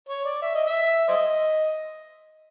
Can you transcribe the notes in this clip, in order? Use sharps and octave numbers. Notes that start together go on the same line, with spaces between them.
C#5
D5
E5
D#5
E5
C5 D#5